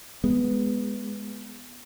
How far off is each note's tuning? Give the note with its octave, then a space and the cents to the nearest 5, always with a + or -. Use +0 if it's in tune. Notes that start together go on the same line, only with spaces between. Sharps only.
G#3 +0 B3 +0